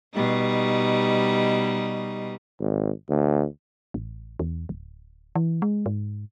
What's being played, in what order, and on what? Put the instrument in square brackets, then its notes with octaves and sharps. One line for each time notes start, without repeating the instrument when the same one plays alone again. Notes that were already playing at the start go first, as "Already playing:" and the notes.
[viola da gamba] B2 G3 D#4
[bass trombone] G#1
D2
[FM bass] A1
E2
D1
E3
G#3
G#2